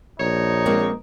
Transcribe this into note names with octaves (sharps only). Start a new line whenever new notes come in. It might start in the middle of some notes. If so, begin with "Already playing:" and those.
A#1 D#4 C#5
G#3 A#3 C4